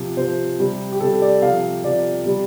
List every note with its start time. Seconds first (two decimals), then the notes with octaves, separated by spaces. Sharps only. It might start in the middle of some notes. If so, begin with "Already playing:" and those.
Already playing: C3 F3
0.17 C3 F3 C5
0.59 C3 G3
0.92 G4
1.00 C3 G3 A4
1.22 D5
1.42 C3 F3 F5
1.84 C3 F3 D5
2.25 C3 G3